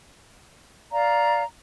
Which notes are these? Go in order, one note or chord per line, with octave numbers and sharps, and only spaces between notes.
D5 F5 A#5